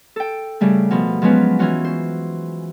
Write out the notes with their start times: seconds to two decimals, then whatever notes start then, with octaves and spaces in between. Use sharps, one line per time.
0.16 A4 G5
0.61 C#3 G3 A3
0.91 B2 F3
1.22 F3 F#3 G#3 B3 C#4 B4
1.59 E3 C#4 F4 F#4
1.84 C5